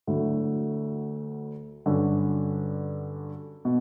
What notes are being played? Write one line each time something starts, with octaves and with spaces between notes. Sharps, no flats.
D2 D3 F#3 A3 E4
G2 D3 F#3 C#4 F#4
B2